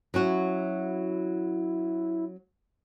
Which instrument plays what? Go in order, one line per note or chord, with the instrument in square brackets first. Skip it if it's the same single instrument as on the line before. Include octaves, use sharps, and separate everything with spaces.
[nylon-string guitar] F#3 C#4 F#4 [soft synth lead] E4